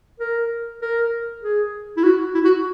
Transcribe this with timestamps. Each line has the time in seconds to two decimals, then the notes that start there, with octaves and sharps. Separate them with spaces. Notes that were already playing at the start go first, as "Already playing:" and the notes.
0.20 A#4
0.82 A#4
1.43 G#4
1.97 E4
2.04 F#4
2.35 E4
2.45 F#4